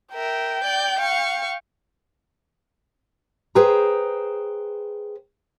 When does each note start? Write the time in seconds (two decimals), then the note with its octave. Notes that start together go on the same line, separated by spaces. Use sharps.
0.14 A#4 E5 G5
0.64 D5 G6
0.99 F5 C#6
3.55 G#4 B4 C5 G5 A#5